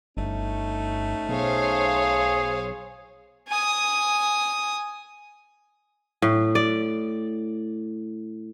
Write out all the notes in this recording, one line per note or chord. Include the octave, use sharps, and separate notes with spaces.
G1 A3 C#4 D#4
B1 G#4 C5 C#5 F5
G#5 D#6
A2
D5